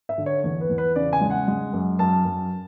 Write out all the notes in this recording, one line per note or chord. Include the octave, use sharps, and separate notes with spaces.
E5
D3
C#5
E2 C#5
B4
E2
B4
C#3 D5
G#5
G#3
F#5
G#3
F#2
F#2 A5
F#2